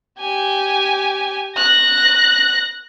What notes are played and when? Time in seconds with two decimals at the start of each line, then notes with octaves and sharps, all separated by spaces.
0.20 G4 G#5
1.56 F#6 A#6